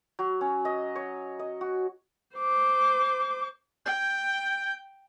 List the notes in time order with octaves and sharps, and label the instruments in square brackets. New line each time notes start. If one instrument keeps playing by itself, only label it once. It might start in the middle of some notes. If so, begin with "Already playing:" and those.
[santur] F#3
C#4
D#5
C#5
D#5
F#4
[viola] C5 D6
[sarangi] G5 [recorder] G6